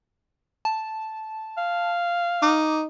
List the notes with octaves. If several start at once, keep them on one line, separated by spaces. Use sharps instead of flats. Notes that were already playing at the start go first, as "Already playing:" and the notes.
A5
F5
D#4 D6